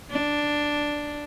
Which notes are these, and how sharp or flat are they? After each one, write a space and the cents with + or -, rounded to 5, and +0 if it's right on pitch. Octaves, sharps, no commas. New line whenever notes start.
D4 +0